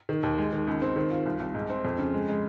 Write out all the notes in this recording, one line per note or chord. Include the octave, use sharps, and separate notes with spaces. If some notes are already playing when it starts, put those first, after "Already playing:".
D#3
D#2
G#3
D#3
C#2
C4
D#3
F4
C2
C2
G#2
C4
F2
C#3
G#3
G#3